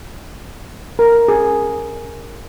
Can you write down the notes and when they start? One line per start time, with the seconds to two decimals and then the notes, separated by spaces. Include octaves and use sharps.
0.99 A#4
1.28 G#4